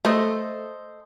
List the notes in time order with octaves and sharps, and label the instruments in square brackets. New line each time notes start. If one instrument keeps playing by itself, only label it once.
[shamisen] A3 [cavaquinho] A4 C5 D#5